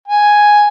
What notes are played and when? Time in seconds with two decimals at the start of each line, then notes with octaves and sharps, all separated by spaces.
0.08 G#5